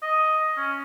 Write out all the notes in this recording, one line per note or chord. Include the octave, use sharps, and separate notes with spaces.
D#5
C#4